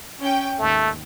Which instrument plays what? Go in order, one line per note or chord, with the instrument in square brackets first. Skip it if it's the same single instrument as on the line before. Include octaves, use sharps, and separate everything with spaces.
[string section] C#4 G5
[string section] D#2 G#2 [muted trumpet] A3